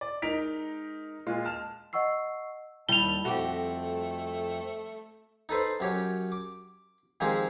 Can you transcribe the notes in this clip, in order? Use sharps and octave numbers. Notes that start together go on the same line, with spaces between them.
D5
G#3 D#4 A#4 B6 D7 F7
A#2 G#3 F4
A5 F6 E7
D#5 F#5 C#6 E6 C7
D#2 G3 E4 A5 F7 G7
F2 A3 C4 F#4 G4
D#4 A4 B4 C5
F#2 G4 C#5
D6
D#3 F3 G#3 C4 G4 G#4